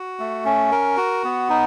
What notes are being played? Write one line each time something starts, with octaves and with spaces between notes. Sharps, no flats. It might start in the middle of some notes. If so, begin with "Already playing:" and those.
Already playing: F#4
A3
C#4
A#4
F#4
B3
D#4